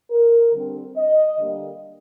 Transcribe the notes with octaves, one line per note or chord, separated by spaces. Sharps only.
A#4
D3 G3 C4
D#5
D3 G3 A#3